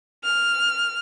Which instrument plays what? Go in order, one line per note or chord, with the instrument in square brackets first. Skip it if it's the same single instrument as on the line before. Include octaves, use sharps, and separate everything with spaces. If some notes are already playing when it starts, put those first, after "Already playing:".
[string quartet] F6